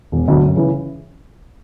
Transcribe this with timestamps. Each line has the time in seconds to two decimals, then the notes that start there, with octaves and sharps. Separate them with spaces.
0.12 E1
0.28 D2 D3 F#3
0.42 F#2
0.57 C#3 E3